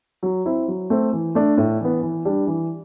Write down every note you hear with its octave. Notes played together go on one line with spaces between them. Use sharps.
F#3
C4 E4
F#3
A3 C4
E3
A3 D4
A2
E3 B3
E3
G3 D4
E3